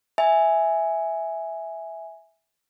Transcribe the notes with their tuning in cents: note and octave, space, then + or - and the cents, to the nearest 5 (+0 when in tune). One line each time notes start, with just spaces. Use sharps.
E5 -5 G#5 +0